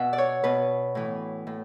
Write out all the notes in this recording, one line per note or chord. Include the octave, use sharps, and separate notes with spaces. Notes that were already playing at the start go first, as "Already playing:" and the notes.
Already playing: B2 E5 F#5
D5
C#5
B2 B4
A2 E3
A2